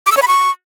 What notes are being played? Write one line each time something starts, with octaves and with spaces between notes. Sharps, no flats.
D6
E6
C#5
B5
C#6